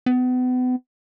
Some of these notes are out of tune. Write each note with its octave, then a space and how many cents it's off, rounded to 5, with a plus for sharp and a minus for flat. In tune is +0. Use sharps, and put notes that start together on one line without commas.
B3 +35